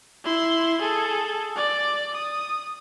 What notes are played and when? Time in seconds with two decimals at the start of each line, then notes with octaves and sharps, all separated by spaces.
0.24 E4 C6
0.81 G#4 A4
1.56 D5 D6
2.13 D#6